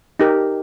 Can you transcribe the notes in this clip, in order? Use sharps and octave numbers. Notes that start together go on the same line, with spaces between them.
D#4 G4 A#4